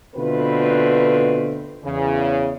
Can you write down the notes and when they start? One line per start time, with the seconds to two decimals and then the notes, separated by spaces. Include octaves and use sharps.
0.15 B2 D3 A3 C4 F4 B4
1.84 E2 C#3